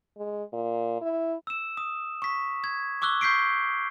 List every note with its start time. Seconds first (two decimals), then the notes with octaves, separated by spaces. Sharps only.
0.17 G#3
0.53 A#2
1.02 E4
1.47 E6 E7
1.77 D#6
2.22 C#6 B6
2.64 G#6
3.02 C#6 D6 E6 F#6 G7
3.21 C#6 G6 B6 C7 D7